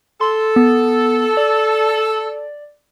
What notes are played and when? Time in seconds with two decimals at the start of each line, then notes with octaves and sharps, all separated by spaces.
0.21 A4 C6
0.56 B3
1.37 D5